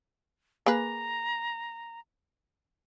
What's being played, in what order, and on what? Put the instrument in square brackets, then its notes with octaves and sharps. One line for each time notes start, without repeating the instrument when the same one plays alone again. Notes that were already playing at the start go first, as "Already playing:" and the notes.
[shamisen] A#3 G#4 B4 [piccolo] A#5